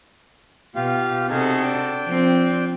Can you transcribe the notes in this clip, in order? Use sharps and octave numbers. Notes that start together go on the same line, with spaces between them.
B2 F4 G4 F5
C3 D#4 F#4 G#4 A4
D4 G5
F3 C4